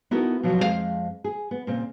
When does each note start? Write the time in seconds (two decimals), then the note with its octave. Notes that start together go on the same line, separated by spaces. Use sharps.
0.11 B3 D#4 E4 F#4 A4 A#4
0.43 B2 F3 F#3
0.59 F2 G#3 C4 A4 F5
1.24 G#4
1.51 B3
1.67 A#2 C#3 C4